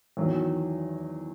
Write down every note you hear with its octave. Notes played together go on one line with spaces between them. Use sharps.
E2 D#3 F#3